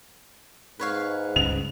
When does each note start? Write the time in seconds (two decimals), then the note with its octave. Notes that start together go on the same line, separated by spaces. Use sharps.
0.79 G#2 B4 C#5 F5
1.36 C#2 G2 C#3 F7